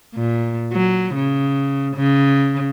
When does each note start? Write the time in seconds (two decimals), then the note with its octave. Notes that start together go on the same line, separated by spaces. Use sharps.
0.15 A#2
0.72 F#3
1.15 C#3
1.96 C#3